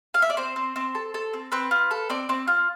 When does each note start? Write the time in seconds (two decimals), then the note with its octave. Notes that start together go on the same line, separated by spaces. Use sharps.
0.14 F5
0.22 E5
0.30 D5
0.37 C4 C5
0.56 C4
0.76 C4
0.95 A4
1.14 A4
1.34 C4
1.52 C4 B4
1.71 F4
1.91 A4
2.10 C4 D5
2.29 C4
2.48 F4